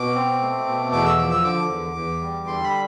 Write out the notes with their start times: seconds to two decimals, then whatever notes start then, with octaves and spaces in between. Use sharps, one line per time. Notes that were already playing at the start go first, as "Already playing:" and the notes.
Already playing: B2 D6
0.15 C4
0.41 A3
0.67 B2
0.92 E2 D6
1.05 E6
1.18 F3 D6
1.31 E6
1.44 D3 D6
1.69 E2
1.95 E2
2.21 G3
2.46 D3 C6
2.64 B5